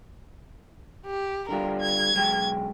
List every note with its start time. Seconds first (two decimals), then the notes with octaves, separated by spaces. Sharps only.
1.06 G4
1.49 D3 G3 F4 A#4
1.81 G#6
2.15 B1 G#3 G5